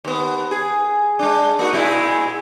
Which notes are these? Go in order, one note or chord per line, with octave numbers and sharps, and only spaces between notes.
D#2 B3
G#4
G#3 D4
A#3 D#4 F#4
A#2 G#3 E4